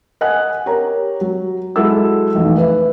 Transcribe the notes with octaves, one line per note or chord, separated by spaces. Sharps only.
D#5 F#5 G#5 F#6
G4 A#4 C#5 A#5
F#3
F#3 G#3 E4 A4 F#5 E6
F1 B1 E2
B4 E5